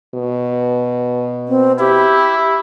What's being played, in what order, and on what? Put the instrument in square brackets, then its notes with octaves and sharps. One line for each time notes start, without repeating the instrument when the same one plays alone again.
[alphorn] B2
[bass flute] C4
[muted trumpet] E4 [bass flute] G4